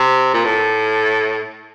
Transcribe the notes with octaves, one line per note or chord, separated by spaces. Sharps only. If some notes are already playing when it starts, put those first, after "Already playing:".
Already playing: C3
A#2
A2